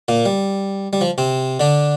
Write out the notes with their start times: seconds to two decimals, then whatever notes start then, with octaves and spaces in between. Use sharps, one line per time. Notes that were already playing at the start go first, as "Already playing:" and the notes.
0.08 A#2 A#3
0.26 G3
0.93 G3
1.01 F3
1.18 C3 C4
1.60 D3 D4